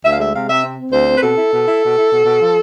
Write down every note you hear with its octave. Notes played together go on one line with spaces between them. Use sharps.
D2 E5
F5
G#3 E5
C3 F5
C3 E5
C4
C4
D2 C5
C4
B4
B2 A4
E4
B2
E4
B2
E4
B2
B2
F3